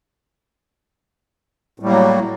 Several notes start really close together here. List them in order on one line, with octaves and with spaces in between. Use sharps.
A2 G3 A#3 F#3